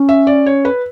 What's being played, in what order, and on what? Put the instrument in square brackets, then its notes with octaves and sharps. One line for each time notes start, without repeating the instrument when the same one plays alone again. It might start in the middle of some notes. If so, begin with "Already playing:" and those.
Already playing: [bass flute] C#4
[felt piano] E5
D5
C#5
B4